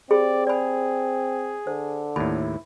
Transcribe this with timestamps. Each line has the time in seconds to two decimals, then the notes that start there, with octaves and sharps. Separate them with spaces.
0.11 C4 G4 G#4 D5 B5
0.47 G#4 D5 B5
1.67 D3 C5
2.16 D#2 A2 E4 B5